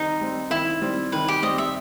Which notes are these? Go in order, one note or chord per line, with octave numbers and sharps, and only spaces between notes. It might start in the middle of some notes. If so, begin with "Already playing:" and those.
Already playing: D#3 G3 C4 D#4
G3 C4
D#3 E4
G3 C4
D#3 B4
G4
G3 C4 D#5
E5